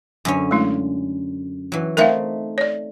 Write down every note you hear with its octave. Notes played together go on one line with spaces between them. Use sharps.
F#2 D3 C#4
G#3 A3 E4
E3 F#3
A3 C4 D#4 A#4 E5 F5
C#5 D5